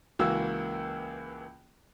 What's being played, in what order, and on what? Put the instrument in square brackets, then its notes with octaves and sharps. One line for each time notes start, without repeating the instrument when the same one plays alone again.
[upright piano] C#2 E3 A#3 F#4 E6